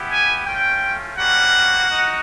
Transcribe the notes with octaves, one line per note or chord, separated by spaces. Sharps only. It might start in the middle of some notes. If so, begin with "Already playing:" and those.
Already playing: B3 E4 G4
G#5
A3 C#4 F4 G5
G3 A#3 C#4 F#4 F#5
D#4 F#4